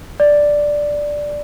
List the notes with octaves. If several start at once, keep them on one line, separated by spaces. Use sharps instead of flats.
D5